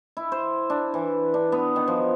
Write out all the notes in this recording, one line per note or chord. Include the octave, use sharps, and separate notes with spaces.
E4
C5
D4
E3
D4
B3
D#3
F3